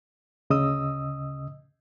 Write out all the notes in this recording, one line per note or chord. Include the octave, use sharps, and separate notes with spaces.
D2 C#3 D#5 D#6 E6